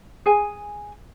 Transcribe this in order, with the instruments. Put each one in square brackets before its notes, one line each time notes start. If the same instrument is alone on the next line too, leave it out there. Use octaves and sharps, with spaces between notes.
[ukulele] G#4 G#5